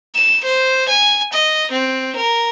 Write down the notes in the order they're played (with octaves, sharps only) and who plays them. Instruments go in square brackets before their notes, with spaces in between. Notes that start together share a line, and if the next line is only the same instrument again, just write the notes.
[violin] E7
C5
G#5
D#5
C4
A#4